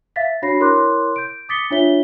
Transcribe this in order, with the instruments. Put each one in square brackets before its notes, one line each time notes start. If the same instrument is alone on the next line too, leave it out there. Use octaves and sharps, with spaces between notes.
[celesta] E5 F5 A6 B6
D4 F#4 C#5 B5 A#6 C7
E4 A#4 C#5 C6 D6 F#6
G6 D7
D6 D#6 A6 B6 C#7 G7
D4 F4 C#5 E5 B6 G7